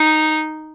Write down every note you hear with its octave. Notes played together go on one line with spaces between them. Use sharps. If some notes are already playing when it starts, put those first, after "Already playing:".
Already playing: D#4